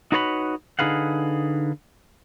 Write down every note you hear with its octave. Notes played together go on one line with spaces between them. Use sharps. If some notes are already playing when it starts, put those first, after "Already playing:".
D#4 F#4 B4 C#5 A5 B5
D3 D#4 G#4 B4 F5 F#5